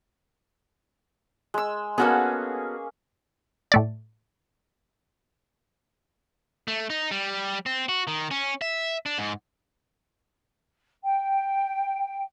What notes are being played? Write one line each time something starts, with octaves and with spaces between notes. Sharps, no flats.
G#3 E6
A#3 B3 C#4 F#4 G#4 A4
A2 A3 D5
A3
D#4
G3
C4
F#4
D#3
C#4
E5
D4
G#2
G5